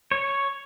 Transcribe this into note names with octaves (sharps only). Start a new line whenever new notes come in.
C#5